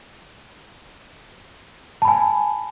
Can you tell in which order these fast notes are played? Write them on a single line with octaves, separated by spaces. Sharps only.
A5 B5 G#5